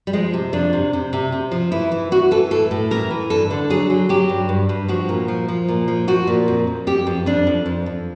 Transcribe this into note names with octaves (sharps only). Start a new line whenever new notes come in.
G3
F3 G#3
C3
F2 D4
C3
C3
C3
C3
F3
E3 E4
E3
E3 F#4
E3 A4
A2 A4
A2
E3 A#4
E3
G2 A4
D3
F#3 G#4
F#3
F#3 G4
G2
G2
G2
F3 F#4
A#2
F3
F3
A#2
F3
F3 F#4
A#2
F2
F2
F2 G4
F2
F2 D4
F2
F2
F2